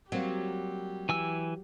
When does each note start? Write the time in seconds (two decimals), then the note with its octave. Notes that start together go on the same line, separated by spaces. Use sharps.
0.12 F#3 G3 A#3 C4 G4
1.09 E3 G#5 E6